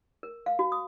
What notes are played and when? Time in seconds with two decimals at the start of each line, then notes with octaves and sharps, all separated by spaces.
0.23 A#4
0.46 F5
0.59 F#4
0.72 D#6